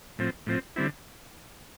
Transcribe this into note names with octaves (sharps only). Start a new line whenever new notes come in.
A2 F3 C4
A2 F3 C4
D3 G3 C4 E4